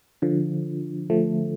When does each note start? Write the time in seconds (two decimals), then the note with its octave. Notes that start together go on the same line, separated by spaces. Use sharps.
0.22 D3 F3
1.10 F3 A3